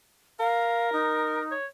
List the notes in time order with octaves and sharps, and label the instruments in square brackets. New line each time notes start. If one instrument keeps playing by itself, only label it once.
[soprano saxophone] A#4 [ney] F5
[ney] D#4
[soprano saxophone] C#5